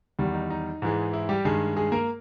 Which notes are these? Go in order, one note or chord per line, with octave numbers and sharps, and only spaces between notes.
E2 D#3 G3
D#4
D#4
G#2 E3 G#3
E4
G3 G4
G2 D#3 G#3 G#4
G#3 G#4
A#3 A#4